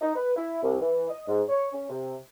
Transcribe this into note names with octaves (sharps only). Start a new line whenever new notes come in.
D#4
B4
E4
C2
E3
D#5
G#2
C#5
C#4
C3